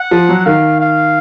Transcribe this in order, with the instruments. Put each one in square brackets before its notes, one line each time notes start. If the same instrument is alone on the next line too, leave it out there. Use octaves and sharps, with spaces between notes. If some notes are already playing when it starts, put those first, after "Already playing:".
Already playing: [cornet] F#5
[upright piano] F3
F#3
[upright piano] D#3 [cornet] F5
[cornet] F5